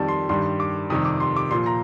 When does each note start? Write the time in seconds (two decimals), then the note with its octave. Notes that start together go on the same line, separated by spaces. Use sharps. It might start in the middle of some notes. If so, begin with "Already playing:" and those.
Already playing: F2 D#3 G3 A5
0.08 C6
0.29 G2 D#3 G3 C6
0.60 D6
0.90 F2 C3 D#3 G3 D#6
1.05 D6
1.20 C6
1.36 D6
1.51 A#2 F3 C6
1.66 A#5